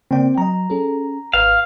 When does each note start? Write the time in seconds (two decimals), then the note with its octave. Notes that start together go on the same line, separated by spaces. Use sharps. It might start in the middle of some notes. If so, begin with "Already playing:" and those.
0.11 C#3 A#3 C4 D5 G5
0.38 F#3 D#5 A#5
0.70 C#4 G#4 A4
1.34 G#1 B4 F5